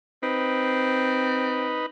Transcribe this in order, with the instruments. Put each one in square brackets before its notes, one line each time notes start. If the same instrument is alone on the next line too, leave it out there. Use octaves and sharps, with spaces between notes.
[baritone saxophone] C4 [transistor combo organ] D#4 B4